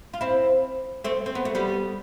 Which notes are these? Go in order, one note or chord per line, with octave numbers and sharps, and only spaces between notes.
F4
C4 E4
A3 C4
C4
B3
A3
G3 B3